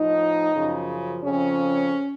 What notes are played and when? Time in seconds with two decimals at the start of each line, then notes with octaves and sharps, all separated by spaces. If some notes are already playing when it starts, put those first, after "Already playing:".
Already playing: A2 F3 D#4
0.54 F#2 C#3 F3
1.23 F2 C#3 F3 C#4